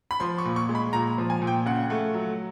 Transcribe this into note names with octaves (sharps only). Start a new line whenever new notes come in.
B5
F3 C6
C#6
A#2
C#6
G#3
B5
A#2 A#5
F3
G#5
A#2
G5
C#3 F#5
A3
F#3